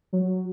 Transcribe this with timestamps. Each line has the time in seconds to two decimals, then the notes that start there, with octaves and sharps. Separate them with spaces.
0.13 F#3